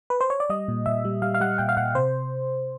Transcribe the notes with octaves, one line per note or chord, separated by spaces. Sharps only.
B4
C5
C#5
D5
G3 D#5
A#2
A#2 E5
G3
G3 F5
F5
G3 F#5
A#2 G5
F5
A#2 F#5
C3 C5